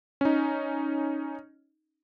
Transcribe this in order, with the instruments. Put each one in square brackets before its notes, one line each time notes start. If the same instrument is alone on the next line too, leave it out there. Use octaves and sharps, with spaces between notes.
[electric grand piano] C#4 D#4